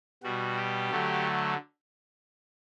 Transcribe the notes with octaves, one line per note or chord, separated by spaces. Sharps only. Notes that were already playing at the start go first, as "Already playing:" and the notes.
B2 G3 F#4
G4
D3 F#3 A3